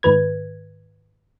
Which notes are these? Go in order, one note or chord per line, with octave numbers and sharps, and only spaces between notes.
G#2 D#3 B4 G#6